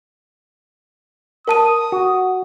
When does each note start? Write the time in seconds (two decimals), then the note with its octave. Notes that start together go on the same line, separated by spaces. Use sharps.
1.48 A#4 A5 D#6 D#7
1.92 F#4